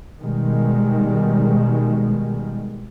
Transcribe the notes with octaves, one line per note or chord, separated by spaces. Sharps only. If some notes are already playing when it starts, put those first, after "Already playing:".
B2 D#3 G3 G#3